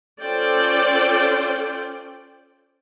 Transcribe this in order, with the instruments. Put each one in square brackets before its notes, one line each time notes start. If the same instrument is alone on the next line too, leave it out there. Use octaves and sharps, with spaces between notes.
[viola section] C#4 F4 A4 C5 D5 G5